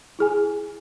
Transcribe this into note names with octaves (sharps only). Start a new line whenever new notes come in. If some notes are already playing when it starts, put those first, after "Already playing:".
E4 G#4 G#5